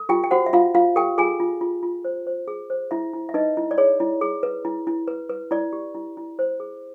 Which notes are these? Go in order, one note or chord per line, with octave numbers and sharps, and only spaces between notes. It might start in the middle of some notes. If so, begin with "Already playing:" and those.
Already playing: A4
F4 G4 G5
G5
F#4 C5 F#5
E5
F4 F5
F4 F5
G4 A4 G5
F4 G#4 G#5
F4
F4
F4
C5
C5
G#4
C5
E4 E5
E4
E5
D#4 B4 D#5
E4
D5
G#4 C#5
E4
G#4
B4
E4
E4
B4
B4
E4 D5
G4
E4
E4
C5
G#4